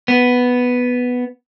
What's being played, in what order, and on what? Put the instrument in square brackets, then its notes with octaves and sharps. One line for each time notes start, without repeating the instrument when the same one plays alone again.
[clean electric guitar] B3